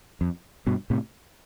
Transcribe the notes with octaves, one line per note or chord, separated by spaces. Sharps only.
F2
G2 B2
A2 C3